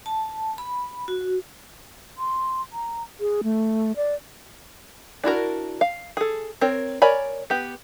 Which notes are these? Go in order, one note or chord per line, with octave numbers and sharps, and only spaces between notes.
A5
B5
F#4
C6
A#5
G#4
A3
D5
D4 E4 F#4 A#4
F5
G#4 A4
C4 A#4 C#5
A#4 C#5 D5 G#5 B5
B3 G4